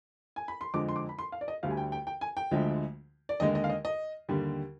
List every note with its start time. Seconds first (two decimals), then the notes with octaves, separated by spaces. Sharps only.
0.36 G#5
0.48 B5
0.61 C6
0.74 F2 D3 F3 G#3 D6
0.89 C6
0.96 D6
1.09 B5
1.19 C6
1.32 F5
1.41 D5
1.48 D#5
1.63 D2 D3 G3 F5
1.70 G#5
1.77 G5
1.92 G5
2.07 G5
2.21 G#5
2.37 G5
2.51 D2 D3 F3 G#3
3.29 D5
3.40 D#2 D3 G#3 D#5
3.55 D#5
3.64 F5
3.70 D#5
3.85 D#5
4.29 D#2 D3 G3